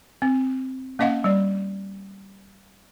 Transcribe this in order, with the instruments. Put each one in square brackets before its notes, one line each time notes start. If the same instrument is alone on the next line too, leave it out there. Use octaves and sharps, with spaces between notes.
[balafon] C4
A#3 C#4 D#5 F5 F#5
G3 D5